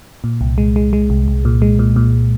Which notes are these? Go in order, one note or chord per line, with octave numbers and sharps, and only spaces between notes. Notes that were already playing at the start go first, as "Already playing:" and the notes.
A#2
C2
G#3
G#3
G#3
C2
C2
A#2
G#3
A#2
A#2